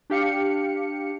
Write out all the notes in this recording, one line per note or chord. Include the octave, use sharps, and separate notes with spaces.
D4 G4 F5 C#7